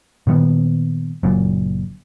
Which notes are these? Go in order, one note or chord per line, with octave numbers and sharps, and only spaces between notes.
A#2 D#3 G3 B3
F#1 F#2 A#2